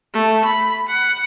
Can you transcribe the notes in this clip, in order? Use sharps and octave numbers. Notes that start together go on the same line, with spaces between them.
A3
B5
F#5